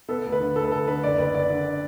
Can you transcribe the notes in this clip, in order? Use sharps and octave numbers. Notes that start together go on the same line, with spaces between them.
B3 A4
D2
B4
D3
D2 A4
B4
D2 A4
D3 B4
F#1 D5
F#1 B4
F#1 D5
D3